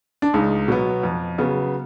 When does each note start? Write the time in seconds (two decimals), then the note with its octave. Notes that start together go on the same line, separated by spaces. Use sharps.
0.22 D4
0.34 C#2 D#4
0.68 B2 F#3 B3
1.03 F2
1.38 C#3 F#3 B3